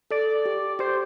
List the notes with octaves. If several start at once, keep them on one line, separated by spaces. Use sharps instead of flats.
A4 D5
G4
G4 C5